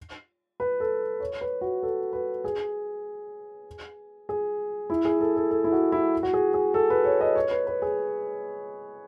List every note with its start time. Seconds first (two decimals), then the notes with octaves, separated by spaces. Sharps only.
0.60 B4
0.80 A4
1.20 C#5
1.41 B4
1.61 F#4
1.83 A4
2.13 B4
2.44 G#4
4.29 G#4
4.90 E4
5.05 G#4
5.21 A4
5.36 A4
5.51 A4
5.64 E4
5.72 F#4
5.92 E4
6.23 F#4
6.33 G#4
6.54 G#4
6.74 A4
6.90 B4
7.05 C#5
7.21 D#5
7.35 C#5
7.51 B4
7.67 B4
7.82 G#4